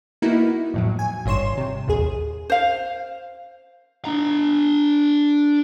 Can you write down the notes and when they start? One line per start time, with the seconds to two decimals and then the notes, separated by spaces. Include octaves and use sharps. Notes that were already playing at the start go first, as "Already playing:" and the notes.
0.22 A#3 B3 D#4 E4 F#4
0.73 F2 A2 F#3
0.99 G#5
1.26 G#1 G2 C#5 C6 E7
1.57 C3
1.87 A1 D#2 G#4
2.50 C5 F5
4.05 D4 A#5